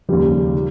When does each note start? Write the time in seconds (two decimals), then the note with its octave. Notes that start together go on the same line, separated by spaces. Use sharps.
0.09 D#2 C#3 F3 G3
0.54 D#3